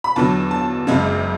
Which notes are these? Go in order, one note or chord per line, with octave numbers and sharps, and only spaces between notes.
B5
E2 D3 F#3 A5
A5
F#1 F#2 C#3 G#3